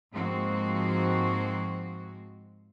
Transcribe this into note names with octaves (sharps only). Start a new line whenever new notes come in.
G#2 F3 G#3 A#3 C4 F#4